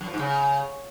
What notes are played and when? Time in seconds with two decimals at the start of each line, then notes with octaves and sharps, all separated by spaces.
0.01 F#2
0.07 F3
0.13 G#2
0.19 C#3